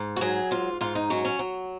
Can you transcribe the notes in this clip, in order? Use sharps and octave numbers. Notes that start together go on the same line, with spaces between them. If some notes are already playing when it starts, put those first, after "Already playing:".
Already playing: G#2
F#4
F#3 G#4
G#2 F4
G#2 F4
D#4
F#3 C#4
C#4
F#3